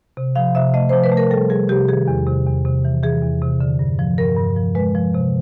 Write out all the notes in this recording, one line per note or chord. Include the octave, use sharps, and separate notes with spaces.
C3
F3 F5
C3 E5
A3 D#5
F3 C5
B4
A3
A#4
G3 A4
G3 G#4
C3 G4
D#3 G#4
E2
C3
E2
C3
E3
E3 G#4
E2
C3
D3
G2
F3
G2 A#4
G2
F3
G#3 B4
F3
C3